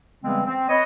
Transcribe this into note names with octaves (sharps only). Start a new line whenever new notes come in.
C#3 E3 G3 G#3 B3 C4
C4
B4 C#5 D#5